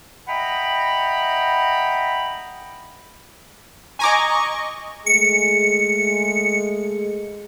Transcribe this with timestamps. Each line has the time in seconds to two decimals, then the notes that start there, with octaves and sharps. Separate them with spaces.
0.28 D#5 E5 F#5 G5 A#5 B5
3.99 D#5 G#5 A#5 C#6 D6
5.06 G#3 A3 G#4 C#7